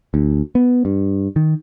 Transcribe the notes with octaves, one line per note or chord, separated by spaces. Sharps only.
D2
B3
G2
D#3